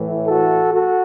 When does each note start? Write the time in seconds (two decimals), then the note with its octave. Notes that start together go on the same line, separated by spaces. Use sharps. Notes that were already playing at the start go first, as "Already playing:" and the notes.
Already playing: A2 E3
0.28 F#4 A4
0.73 F#4 A4